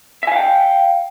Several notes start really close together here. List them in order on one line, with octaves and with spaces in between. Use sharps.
E5 G#5 F5 G5